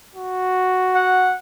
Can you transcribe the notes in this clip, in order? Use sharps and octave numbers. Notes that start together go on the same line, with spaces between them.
F#4
F#5